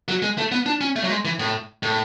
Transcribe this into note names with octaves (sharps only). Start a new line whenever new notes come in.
F#3
G#3
A3
B3
D4
C#4
A3
F#3
G#3
E3
A2
A2